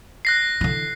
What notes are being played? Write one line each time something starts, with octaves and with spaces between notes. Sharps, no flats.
F#6 A#6 C7
D3 E3